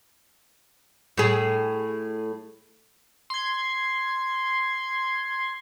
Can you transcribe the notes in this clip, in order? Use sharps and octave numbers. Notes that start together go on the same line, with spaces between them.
A2 G#4
C6 G#6